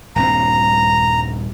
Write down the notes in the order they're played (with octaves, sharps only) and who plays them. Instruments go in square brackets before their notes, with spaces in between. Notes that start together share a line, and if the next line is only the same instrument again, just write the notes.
[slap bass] D#1 G2 C4 [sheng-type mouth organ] A#5